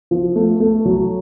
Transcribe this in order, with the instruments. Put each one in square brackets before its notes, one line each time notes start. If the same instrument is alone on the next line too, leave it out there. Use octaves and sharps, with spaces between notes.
[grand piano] F3
A3
A3
F#3